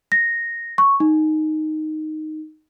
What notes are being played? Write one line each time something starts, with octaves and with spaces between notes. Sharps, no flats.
A#6
C#6
D#4